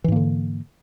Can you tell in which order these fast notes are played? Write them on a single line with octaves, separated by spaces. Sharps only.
E3 G#2 A#3 D3